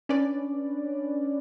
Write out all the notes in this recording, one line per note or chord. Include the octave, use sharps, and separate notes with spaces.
C#4 D4 B4 D5